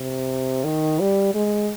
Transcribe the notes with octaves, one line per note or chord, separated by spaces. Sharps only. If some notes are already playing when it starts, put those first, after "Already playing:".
Already playing: C3
D#3
G3
G#3